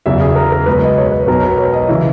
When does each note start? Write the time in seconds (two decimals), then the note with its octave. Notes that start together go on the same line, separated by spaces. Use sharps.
0.06 E2 C#3 F#3 E5
0.21 G#4
0.36 A#4
0.52 A#4
0.66 C#2 B2 F#3 B4
0.82 D#5
0.98 C#5
1.12 B4
1.27 B1 B2 F#3 A#4
1.43 B4
1.58 C#5
1.73 D#5
1.89 C#3 E3 E5